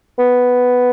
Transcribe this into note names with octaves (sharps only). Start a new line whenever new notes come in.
B3